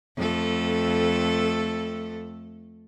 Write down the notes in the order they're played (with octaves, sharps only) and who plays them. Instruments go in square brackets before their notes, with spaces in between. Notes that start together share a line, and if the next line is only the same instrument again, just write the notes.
[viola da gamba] F2 A3 A4